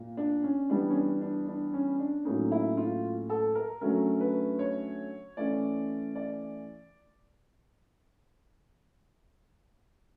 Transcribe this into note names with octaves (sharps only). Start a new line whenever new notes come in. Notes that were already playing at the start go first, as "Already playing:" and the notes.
Already playing: A#2 A#3
D4
C#4
E3 G3 B3 D4
C#4
D4
D4
D4
C#4
D4
A2 F#3 A#3 C#4 D#4
E4
F4
A4
A#4
D3 F#3 A3 C#4 A#4
B4
C#5
E3 A3 C#4 D5
D5